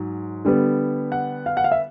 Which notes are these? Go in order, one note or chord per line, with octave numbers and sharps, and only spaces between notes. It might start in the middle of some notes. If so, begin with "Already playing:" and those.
Already playing: G#2 F#3
D3 G3 B3
F#5
F5
F#5
F5
E5